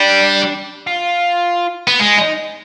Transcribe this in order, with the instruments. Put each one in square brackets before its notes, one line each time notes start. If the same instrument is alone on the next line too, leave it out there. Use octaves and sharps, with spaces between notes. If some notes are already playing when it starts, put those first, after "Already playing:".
Already playing: [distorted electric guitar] G3 [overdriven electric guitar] D4
[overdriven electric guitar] F4
[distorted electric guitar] B3
G#3
[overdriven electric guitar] D#4